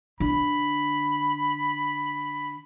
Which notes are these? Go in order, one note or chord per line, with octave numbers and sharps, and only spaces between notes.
D3 B5